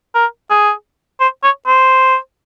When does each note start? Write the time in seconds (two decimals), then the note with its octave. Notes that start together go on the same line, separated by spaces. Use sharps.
0.15 A#4
0.50 G#4
1.20 C5
1.43 C#5
1.67 C5